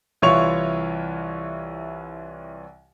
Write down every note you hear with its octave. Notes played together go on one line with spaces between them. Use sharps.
C2 E3 F4 C#5 C#6 F7